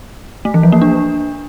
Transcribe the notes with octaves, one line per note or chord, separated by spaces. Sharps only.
A3
E3
F3
A#3
D4